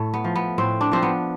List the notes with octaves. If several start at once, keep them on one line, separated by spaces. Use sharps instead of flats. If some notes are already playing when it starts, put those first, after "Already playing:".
Already playing: A2 A3
B3
F3
B3
A2 C4
D4
F3 C4
B3